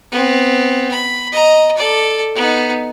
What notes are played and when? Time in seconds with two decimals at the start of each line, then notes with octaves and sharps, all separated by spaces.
0.11 B3 C4
0.91 B5
1.32 D#5 A#5
1.77 A4 D5
2.35 B3 D#4